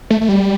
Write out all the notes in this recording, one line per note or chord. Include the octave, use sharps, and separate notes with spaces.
A3
A3
G3